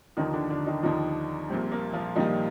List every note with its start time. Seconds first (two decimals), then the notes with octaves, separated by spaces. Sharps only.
0.17 D#2 D3 D#3 F3 D#4
0.33 D3 D4
0.50 D3 D4
0.67 D#3 D#4
0.83 D#2 D3 D#3 F3 D#4
1.49 A#1 A#2 G3 C4
1.72 A#3
1.93 F3 F4
2.16 A#1 A#2 D#3 G3 D#4